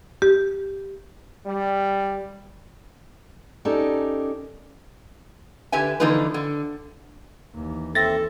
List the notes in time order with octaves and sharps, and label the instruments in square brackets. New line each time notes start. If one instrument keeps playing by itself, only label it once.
[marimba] G4
[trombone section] G3
[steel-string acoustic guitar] C#4 D#4 G4 A4 A#4 D5
[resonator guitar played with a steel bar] D3 G4 B4 E5 G#5
D3 E3 F3 A#3 D#4 B4
D3
[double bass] D#2 E3
[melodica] C4 E5 [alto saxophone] A4 [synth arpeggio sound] A6 A#6